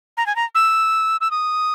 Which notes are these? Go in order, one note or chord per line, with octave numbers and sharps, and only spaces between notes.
A#5
G#5
A#5
E6
E6
D#6